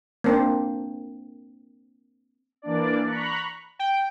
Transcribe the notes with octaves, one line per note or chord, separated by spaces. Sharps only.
A#3 C4 D4
E3 A#3 D4 D5
A#5 B5 C#6 F#6
G5